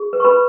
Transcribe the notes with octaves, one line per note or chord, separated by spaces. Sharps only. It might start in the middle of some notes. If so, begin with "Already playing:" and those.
Already playing: G#4
B4
C#6
B4 B5